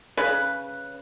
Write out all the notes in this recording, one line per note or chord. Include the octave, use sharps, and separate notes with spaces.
C#3 B4 B5